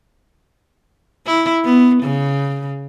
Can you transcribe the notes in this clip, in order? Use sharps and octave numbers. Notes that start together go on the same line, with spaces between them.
E4
B3
C#3